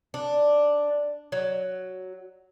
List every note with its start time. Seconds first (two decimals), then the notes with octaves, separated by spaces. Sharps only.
0.14 D4
1.32 F#3